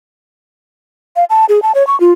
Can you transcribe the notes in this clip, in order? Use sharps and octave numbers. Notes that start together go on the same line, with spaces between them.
F5
A5
G#4
A5
C#5
C#6
F4